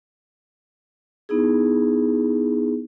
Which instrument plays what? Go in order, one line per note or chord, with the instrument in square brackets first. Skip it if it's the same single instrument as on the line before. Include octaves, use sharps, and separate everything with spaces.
[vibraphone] B3 D#4 E4 G#4